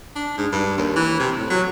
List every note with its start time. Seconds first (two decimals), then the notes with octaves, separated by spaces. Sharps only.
0.16 D4
0.38 G#2
0.52 G2
0.78 D#2
0.96 E3
1.20 C3
1.38 A2
1.50 F#3